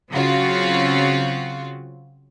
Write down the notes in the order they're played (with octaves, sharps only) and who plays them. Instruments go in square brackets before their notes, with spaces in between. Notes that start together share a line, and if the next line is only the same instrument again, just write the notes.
[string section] C#3 F#3 C4 F4 F#4